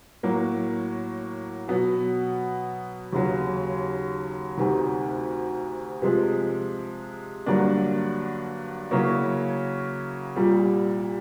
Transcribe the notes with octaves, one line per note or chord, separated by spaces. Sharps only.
A2 F#3 A#3
B2 F#3 B3
D#2 C#3 F#3
D2 C3 D#3
C3 F3 G#3
G2 D3 F#3 A#3 D4
C#3 F#3 A#3 C#4 E4
C2 A#2 G3